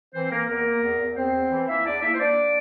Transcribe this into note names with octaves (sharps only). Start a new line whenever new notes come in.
E3 C4 C5
E3 A#3 A#4
E2 A#3 A#4
A#3
E2
E2
E2 C4 C5
E2
E3
A#3 E4 E5
E2 D4 D5
A#3 E4 E5
C5
A#3 D4 D5
A#3